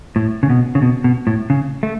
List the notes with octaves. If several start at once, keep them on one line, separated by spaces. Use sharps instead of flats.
A2
C#3
B2
C#3
B2
B2
A2
C#3
A3